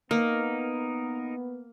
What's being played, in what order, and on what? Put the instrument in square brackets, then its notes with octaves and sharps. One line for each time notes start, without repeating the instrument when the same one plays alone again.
[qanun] A#3 [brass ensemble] B3 [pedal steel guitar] D#4 A#4